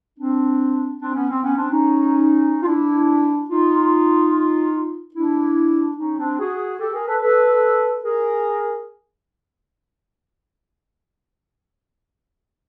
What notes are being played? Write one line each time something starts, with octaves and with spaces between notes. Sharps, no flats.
C4 D4
C4 D4
B3 C#4
C4
B3 C#4
C4 D4
C#4 D#4
F4
D4 E4
D#4 F4
D4 E4
C#4 D#4
C4 D4
F#4 G#4
G4 A4
G#4 A#4
A4 B4
A4 B4
G#4 A#4